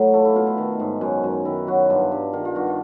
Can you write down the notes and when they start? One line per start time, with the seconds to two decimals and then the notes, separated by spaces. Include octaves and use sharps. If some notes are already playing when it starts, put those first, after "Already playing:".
Already playing: A2 F#3
0.14 A3 F4
0.25 E4
0.35 B2 F4
0.47 E4
0.57 D#3 F4
0.80 G#2
1.01 F#2
1.24 F#2
1.45 D#3 E4
1.67 F#3 F#4
1.90 G2 F4
2.12 G2
2.33 D#3 F4
2.45 F4
2.55 G2 F#4
2.67 F4